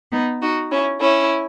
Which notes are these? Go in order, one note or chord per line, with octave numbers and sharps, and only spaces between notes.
B3 D#4
D#4 F#4
C#4 E4
C#4 E4